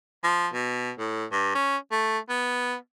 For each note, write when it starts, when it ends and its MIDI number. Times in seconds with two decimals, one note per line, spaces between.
0.24 0.48 53
0.53 0.92 47
0.99 1.25 45
1.31 1.52 43
1.55 1.77 61
1.91 2.18 57
2.29 2.76 59